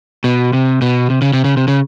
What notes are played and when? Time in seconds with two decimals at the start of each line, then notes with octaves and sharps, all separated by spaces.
0.24 B2
0.53 C3
0.82 B2
1.10 C3
1.22 C#3
1.33 C3
1.44 C#3
1.57 C3
1.68 C#3